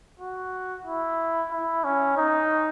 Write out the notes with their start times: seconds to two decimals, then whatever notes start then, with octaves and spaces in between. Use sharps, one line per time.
0.20 F#4
0.85 E4
1.51 E4
1.84 C#4
2.17 D#4